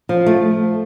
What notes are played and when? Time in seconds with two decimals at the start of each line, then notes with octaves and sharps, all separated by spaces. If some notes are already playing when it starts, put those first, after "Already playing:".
0.09 F3
0.26 A3